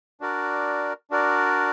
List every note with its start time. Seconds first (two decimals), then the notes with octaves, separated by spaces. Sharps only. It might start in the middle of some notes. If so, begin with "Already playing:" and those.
0.20 D4 F#4 A#4 D5
1.11 D4 F#4 A#4 D5